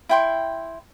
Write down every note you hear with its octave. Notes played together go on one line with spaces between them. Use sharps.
E4 G5 C6